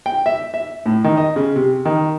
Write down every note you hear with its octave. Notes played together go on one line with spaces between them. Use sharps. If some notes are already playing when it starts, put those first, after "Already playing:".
G5
E5
E5
A2
D#3
D#5
C#3
C3
D#3